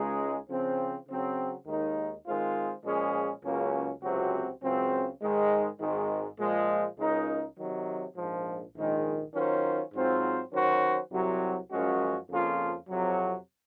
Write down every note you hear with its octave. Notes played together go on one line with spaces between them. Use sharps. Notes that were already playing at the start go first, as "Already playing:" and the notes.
Already playing: C#2 C#3 G#3 D#4 G#4
C#3 F3 C4
C#3 F#3 C4
D#2 D#3 G#3 D#4
D#3 G#3 C4 F4 C5
A#2 F3 G#3 C#4 G#4
C#2 C#3 F#3 A#3 C#4
C#2 C3 F#3 C4 F#4
C#2 C#3 F#3 C4
G#2 D#3 G#3
G#1 G#2 D#3 G#3
A#2 F3 G#3
C#2 C#3 G#3 D#4 A#4
C3 D#3 F#3
A#1 G#2 F3
A#1 G#2 D#3 G#3
D#3 F#3 C#4 F4 C5
G#2 F#3 C4 F4 C5
D#3 F#3 C#4 F#4 C5
C2 C3 F#3
F#2 F3 G#3 C#4 F#4
F2 C#3 F3 A#3 F4
F2 C3 F#3